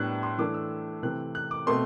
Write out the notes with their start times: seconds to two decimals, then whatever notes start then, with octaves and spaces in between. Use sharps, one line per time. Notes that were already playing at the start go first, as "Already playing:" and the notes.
Already playing: A2 G3 B3 D4 F#6
0.23 C6
0.38 E3 A3 D4 D6
0.54 E6
1.03 C3 E3 A3 C4 F#6
1.35 F#6
1.51 D6
1.66 B2 A3 C4 C6